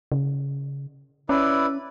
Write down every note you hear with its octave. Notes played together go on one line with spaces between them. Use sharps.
C#3
C#4 E4 B4 D5